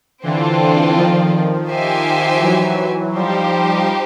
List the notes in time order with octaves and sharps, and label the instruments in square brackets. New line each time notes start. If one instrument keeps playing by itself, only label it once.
[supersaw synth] D3 E3 [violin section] C4 F4 A4 D5
[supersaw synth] D#3 F3
[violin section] D#4 G4 C5 E5 G#5
[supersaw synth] E3 F#3
[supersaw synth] F3 G3 [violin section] D#4 G4 C5